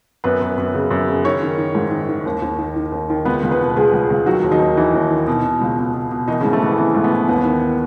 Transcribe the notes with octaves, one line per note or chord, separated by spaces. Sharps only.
F#2 B3 B4
F#2
F#2
C#3
F#2
C#3
D#3 C#4 C#5
D#3
D#3
G#2
D#3
D#3
D#2
D#2
D#3
D#3
D#2
D#3
C#2 B3 B4
C#2
B3 B4
B2
C#2 G#3 G#4
C#2
C#2
D#3 F#3 F#4
D#2
D#3 D#4
D#2
D#3 E3 E4
D#2
D#3
B2
B2
C#2
B2
B2
B2
D#3 E3 D#4
C#3 C#4
G#2
A3
E3 B3
A3
E3 B3
G#2 A3
B3
E3
D#2 B3
D#3